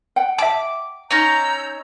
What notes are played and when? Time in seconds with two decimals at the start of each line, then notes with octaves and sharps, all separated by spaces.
0.16 F#5 G5
0.38 E5 A5 D6
1.11 C#4 D#4 A#5 E6 G6